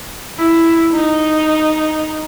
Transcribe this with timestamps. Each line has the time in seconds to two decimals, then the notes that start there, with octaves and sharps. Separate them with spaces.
0.38 E4
0.93 D#4